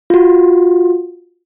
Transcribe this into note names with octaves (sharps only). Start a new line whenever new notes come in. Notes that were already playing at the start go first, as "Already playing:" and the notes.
F4 F#4